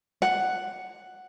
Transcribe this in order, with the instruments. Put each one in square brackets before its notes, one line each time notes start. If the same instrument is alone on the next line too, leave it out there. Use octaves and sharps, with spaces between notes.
[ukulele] F#5